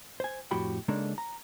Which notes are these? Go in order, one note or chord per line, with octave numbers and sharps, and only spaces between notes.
C5 G#5
F2 A2 F#4 G4 B5
C#3 G#3 A#3 D4 D#4 A4
A#5